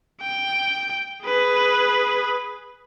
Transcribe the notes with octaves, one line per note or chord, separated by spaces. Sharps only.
G5
G#4 B4